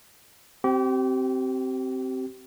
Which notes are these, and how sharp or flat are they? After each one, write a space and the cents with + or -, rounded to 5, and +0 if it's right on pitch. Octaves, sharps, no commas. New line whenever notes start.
C4 +0 G4 -35